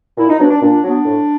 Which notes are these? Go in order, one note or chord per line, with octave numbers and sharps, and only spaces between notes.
A#2 E4
D#4
F#3 B3 D4
D4
A#2 D4
F#3 B3 D4
A2